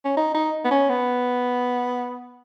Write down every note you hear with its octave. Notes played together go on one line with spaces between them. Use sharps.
C#4
D#4
D#4
B3
C#4
B3